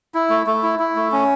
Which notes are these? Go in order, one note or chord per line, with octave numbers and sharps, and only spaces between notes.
E4
A3
A3
E4
E4
A3
C#4